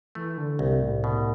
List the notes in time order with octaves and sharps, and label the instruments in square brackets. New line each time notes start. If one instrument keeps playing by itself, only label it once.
[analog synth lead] E3 [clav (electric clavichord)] A3
[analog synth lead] D3
[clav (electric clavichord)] C2 [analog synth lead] C3
[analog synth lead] A2
[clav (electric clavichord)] B2